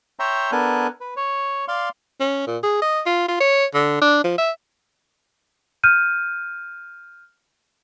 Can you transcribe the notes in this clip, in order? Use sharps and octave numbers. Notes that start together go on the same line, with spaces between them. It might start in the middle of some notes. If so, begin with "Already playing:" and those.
C#5 E5 G5 A#5 C6
B3 D4 A4 A#4 G#5 F#6
B4
C#5
D5 F5 C6
C#4
A#2
G#4
D#5
F4
F4
C#5
D3
D4
F3
E5
F6 G6 D#7